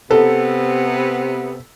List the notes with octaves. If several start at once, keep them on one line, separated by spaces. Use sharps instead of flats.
C3 B3 A4